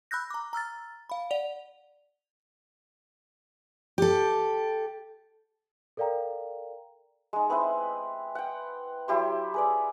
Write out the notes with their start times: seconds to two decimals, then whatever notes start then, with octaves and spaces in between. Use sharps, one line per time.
0.11 B5 E6 F#6 G6 A#6
0.30 A#5 D6
0.53 A#5 E6 F6 A6
1.10 F5 B5
1.30 D5 F#5 F7
3.98 G4 A4
5.97 A4 A#4 D5 F5 G5 A#5
7.33 G#3 D#4
7.50 B3 C4 E4 B4
8.35 F#5 G5
9.08 F#3 E4 G4 C6
9.54 G#4 B4 D5